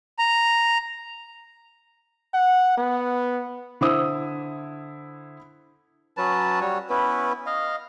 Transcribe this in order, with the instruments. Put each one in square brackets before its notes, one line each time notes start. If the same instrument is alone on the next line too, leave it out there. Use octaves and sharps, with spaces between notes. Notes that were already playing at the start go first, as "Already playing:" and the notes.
[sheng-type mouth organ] A#5
[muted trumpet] F#5
B3
[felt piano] D3 E4 C5 D#6 E6
[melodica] F#3 C#4 B4 A5
G3 F#4 C#5
B3 C#4 E4 B4
D#5 F5